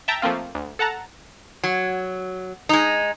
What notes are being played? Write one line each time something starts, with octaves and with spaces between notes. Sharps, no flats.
E5 G5 A5 A#5
F3 A3 A#3 C4 F4
D2
A4 F#5 A5 A#5
F#3
G#3 D#4